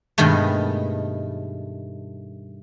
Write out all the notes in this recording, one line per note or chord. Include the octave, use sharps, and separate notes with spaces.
G2 B2 D#3 G#3 A3